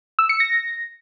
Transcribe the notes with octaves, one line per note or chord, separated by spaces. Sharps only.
E6
C#7
A#6